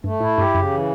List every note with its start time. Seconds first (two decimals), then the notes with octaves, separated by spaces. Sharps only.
0.04 G2 A3
0.20 A2 E4
0.37 G2 G4
0.54 F#2 C#3
0.71 E3